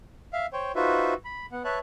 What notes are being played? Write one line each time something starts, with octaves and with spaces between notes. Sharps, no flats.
E5 F5
C5 C#5 G5
D#4 F4 F#4 B4 C5 E5
B5
B3 F#5
B4 C#5 E5 A5 F#6